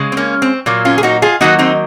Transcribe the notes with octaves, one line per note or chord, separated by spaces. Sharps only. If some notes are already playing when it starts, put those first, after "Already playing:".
Already playing: C#3 G#3
C4
A#3 C#4
C4
A#2 F#3 A#3
C#4 F4
G#4
D#4 F#4
F4 G#4
D#3 F#3 A#3 D#4 F#4
C4 D#4